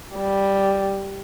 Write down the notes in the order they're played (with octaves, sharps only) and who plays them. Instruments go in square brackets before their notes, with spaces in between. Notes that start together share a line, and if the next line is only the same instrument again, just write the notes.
[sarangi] G3